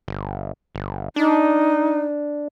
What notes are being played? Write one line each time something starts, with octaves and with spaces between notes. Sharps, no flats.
G1
G1
D4 D#4